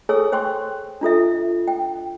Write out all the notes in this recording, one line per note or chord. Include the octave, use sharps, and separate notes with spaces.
G#4 A4 C#5 G#5 E6
C5 G5 C6 C#6
D4 F4 A4 E5
G5